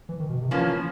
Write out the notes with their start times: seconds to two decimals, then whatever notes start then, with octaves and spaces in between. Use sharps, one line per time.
0.09 E3
0.20 D#3
0.30 B2
0.41 C3
0.51 A2 E3 F3 A#3 C#4